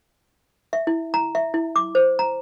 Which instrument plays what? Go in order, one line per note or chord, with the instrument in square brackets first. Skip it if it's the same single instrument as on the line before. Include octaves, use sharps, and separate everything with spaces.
[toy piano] E5
E4
A#5
E5
E4
D6
C5
A#5